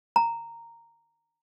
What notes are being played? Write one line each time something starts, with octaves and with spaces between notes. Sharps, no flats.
A#5